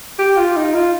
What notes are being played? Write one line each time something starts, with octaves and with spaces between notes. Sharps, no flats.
G4
F4
D#4
F4